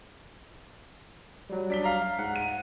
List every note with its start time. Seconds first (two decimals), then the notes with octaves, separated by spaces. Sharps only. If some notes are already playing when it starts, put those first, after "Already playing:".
1.50 F#3 G3
1.70 D4 B6 G7
1.84 F5 A#5
2.18 G#2 F#5
2.36 D#7